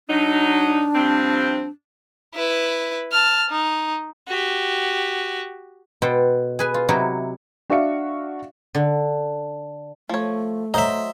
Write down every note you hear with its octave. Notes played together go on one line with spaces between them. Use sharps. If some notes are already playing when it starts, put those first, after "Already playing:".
F#3 D4 D#4
G2 F3 C4
E4 B4
A5 F6
D#4
F#4 G4
B2 A4 B4 C5 G5
G#4 B4 G#5
F4
C3 F#3 D#4 E4 F#4
D4 F#4 D5 E5 F5 C#7
D3
F3 A3 C#5
F#3 C5 D#5 E5 A#5